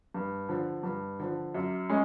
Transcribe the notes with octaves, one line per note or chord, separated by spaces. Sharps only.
G2
D3 F3
G2
D3 F3
F#2
G#3 C#4